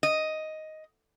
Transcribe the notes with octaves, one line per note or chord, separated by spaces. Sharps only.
D#5